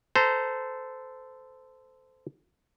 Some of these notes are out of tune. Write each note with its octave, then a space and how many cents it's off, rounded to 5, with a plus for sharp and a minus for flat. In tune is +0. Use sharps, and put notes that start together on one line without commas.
A4 +0 C5 -20 A#5 +0